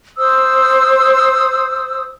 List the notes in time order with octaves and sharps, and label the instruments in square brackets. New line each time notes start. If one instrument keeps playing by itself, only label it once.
[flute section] C5 D#6 E6